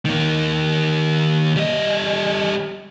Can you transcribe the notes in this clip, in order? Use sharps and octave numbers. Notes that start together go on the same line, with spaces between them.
D#3 A#3
G3 D#5